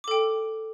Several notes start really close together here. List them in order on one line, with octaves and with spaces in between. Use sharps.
D6 A4 G5